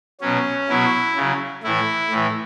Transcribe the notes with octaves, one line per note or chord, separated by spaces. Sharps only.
B2 F#3 C#4
B2 F#3 E4
C#3 F#3
A2 E3 E4
A2 E3